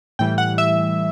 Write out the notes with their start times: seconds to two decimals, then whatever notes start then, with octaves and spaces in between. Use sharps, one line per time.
0.19 A2 E3 G3 G5
0.38 F#5
0.58 E5